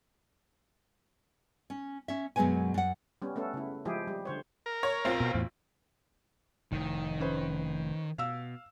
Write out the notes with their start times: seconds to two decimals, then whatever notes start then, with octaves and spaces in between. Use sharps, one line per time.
1.70 C#4
2.08 C#4 E5
2.36 F#2 B2 F#3 G#3 B3 G#5
2.74 F#2 F#5
3.22 G3 B3 C#4
3.36 A3 B3 C#4 A4
3.54 C#3 E4
3.85 F3 G#3 E4 G4 G#4
4.07 G3
4.25 D3 C5 C#5
4.66 A#4
4.83 C#5
5.05 B1 C4 F4
5.20 B2
5.34 E2 A2
6.72 F1 A2 D#3
7.20 C#4 B4 C5
8.18 B2 F5 E6